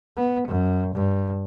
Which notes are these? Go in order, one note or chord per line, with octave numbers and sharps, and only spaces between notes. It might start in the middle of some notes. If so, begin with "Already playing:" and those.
B3
F#2
G2